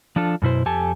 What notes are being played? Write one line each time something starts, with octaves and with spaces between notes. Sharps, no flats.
F3 D4 F4 A4
F#2 B2 E4 C5
F2 G4 A4 G#5 A5